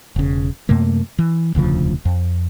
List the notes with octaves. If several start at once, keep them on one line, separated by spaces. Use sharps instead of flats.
E1 C#3
F#2 C3 A3 A#3
E3
E1 D2 C#3 F3
F2